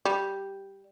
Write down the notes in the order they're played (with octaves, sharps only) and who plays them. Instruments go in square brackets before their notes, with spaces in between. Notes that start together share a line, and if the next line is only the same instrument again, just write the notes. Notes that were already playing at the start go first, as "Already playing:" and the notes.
[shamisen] G3